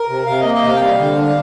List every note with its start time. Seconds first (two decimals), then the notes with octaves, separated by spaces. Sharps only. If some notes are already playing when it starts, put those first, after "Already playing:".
Already playing: A#4
0.09 C3
0.26 C3 F5
0.41 A#3 D#5
0.54 D#5
0.62 C3
0.67 F5
0.76 G5
0.81 G3 F5
0.99 D3
1.18 D4